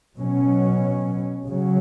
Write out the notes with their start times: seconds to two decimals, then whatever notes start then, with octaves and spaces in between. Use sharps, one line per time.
0.17 B2 F#3 C#4
1.46 C#3 F#3 C#4